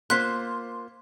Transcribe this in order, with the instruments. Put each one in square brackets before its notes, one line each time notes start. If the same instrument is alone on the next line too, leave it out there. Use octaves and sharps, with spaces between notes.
[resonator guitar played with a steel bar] A#3 F4 C5 [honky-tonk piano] C6 [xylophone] F#6 B6